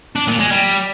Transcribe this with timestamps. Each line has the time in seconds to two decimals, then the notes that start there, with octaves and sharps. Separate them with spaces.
0.16 D4
0.27 A#2
0.39 G#3
0.51 G3